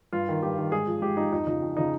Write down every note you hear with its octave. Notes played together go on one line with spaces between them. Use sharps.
G2 F4
D#3
G2 G4
D#3
G#2 G#4
F3
G#2 G4
F3 D#4
F2 D#4
C#3 F3 D#4
F2
C#3 F3 D#4